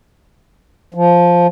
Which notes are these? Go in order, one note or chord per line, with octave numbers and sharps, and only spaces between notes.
F3